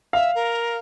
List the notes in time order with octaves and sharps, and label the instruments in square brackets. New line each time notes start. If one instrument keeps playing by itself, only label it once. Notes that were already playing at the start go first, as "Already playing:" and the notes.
[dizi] E5 [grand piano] F5
[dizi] A#4